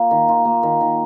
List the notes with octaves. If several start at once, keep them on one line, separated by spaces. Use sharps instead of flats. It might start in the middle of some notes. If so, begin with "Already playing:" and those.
Already playing: A#3 F4
D#3
F4
A#3
D#3
D#3